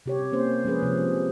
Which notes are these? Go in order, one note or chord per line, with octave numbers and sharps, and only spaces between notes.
C3 G4 C#5
A#3 C#4 C5
F3 G#3 C#4 G#4 B4
C3 F3